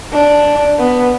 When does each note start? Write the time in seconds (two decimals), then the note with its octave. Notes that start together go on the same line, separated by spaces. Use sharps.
0.13 D4
0.79 B3